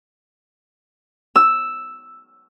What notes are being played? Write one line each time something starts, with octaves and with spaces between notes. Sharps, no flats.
E6